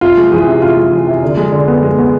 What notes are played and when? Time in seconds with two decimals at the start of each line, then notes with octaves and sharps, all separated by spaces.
0.01 C3 F4
0.17 G#3
0.32 E3 G#4
0.47 C3
0.61 C3 F4
0.77 G#3
0.92 E3
1.07 C3
1.23 D3
1.37 G#3
1.52 D3
1.68 B3
1.83 G#3
1.98 B3